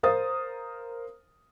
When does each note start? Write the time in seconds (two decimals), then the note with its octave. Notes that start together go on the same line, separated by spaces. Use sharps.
0.03 A#4 C5 F5 D#6 A6